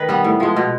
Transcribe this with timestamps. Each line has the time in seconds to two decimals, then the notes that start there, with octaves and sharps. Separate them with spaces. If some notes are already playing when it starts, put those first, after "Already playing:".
Already playing: D#3 B4
0.09 G3 B3
0.24 A2
0.40 F3 G#3
0.56 B2